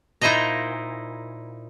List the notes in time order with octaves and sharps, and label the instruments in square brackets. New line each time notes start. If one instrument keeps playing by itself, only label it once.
[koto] A#2 D#4 E4 C5 D#5 A#5